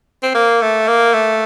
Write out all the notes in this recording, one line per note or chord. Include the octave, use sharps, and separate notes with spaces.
C4
A#3
A3
A#3
A3